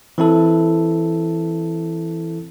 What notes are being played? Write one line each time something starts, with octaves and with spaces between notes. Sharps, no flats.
E3 C4 E4 A4